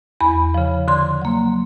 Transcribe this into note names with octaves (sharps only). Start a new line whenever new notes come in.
E2 B5
C#3 F3
D3 C6
F#3 A#3